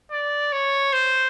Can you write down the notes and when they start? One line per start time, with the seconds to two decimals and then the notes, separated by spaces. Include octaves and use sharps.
0.11 D5
0.53 C#5
0.93 C5